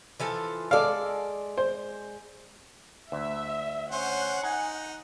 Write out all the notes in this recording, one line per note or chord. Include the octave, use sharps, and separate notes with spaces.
E3 F3 A4
G#3 A4 D5 F5
C5
D2 E5
C#4 C5 F#5
D#4 G#5